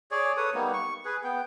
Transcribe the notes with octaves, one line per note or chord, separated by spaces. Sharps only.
G#4 C#5 D5
A4 B4 C#5 D#6
G3 A#3 B3 D#4
C#6
G#4 B4
B3 G5